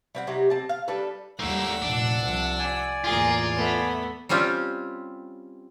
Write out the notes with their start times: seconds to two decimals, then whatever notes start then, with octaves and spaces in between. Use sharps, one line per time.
0.15 G3 C4 F#5
0.27 C3 F#3 D#4 G4
0.50 C4 A5
0.69 F5
0.88 G3 D4 A4 B4
1.39 D#2 G3 A3 A#3 F#5 E6
1.82 F1 A#2 D4
2.20 C2 C3 F3
2.59 D5 G#5
3.04 E2 A2 A#3 F4 G#4
3.56 A3 B3
4.29 G3 C4 C#4 F4 G4